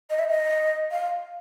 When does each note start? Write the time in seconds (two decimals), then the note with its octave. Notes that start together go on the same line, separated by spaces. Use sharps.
0.10 D#5
0.19 E5
0.29 D#5
0.91 F5